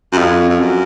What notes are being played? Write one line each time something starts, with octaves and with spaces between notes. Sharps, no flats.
F#2
F2
F2
F#2